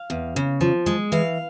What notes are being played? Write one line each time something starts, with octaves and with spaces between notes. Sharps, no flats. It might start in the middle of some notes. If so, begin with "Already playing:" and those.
Already playing: F5
E2
C#3
F3
G#3
E3 F5